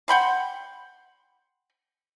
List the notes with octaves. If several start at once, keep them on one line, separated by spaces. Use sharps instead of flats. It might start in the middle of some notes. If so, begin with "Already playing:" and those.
F#5 G5 B5 C6